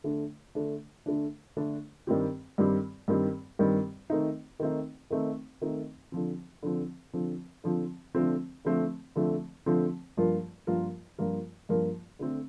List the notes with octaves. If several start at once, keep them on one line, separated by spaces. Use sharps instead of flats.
D3 A3 D4
D3 A3 D4
D3 A3 D4
D3 A3 D4
G2 D#3 G3 C4 G4
G2 D#3 G3 C4 G4
G2 D#3 G3 C4 G4
G2 D#3 G3 C4 G4
D#3 A3 C4 D#4
D#3 A3 C4 D#4
D#3 A3 C4 D#4
D#3 A3 C4 D#4
D3 F3 C4
D3 F3 C4
D3 F3 C4
D3 F3 C4
D3 F3 A3 C4
D3 F3 A3 C4
D3 F3 A3 C4
D3 F3 A3 C4
G2 F3 A#3 F4 A#4
G2 F3 A#3 F4 A#4
G2 F3 A#3 F4 A#4
G2 F3 A#3 F4 A#4
D3 A3 C4